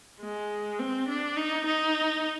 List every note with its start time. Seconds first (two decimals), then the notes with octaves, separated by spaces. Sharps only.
0.21 G#3
0.79 C4
1.08 D4
1.36 D#4
1.66 D#4